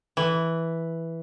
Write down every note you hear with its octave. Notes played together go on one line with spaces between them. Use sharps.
E3